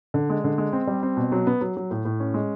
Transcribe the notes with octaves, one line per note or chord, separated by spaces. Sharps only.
D3
G#3
D3
G#3
C4
G3
C4
B2
F#3
B3
F#3
F#3
A2
A2
C#4
G#3